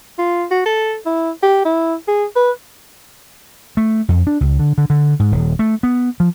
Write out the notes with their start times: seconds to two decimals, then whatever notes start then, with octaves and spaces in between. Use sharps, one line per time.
0.19 F4
0.51 F#4
0.66 A4
1.06 E4
1.42 G4
1.65 E4
2.08 G#4
2.36 B4
3.77 A3
4.09 F2
4.27 D4
4.41 C#2
4.59 D3
4.78 D3
4.90 D3
5.19 G#2
5.32 D#1
5.59 A3
5.83 B3
6.20 F3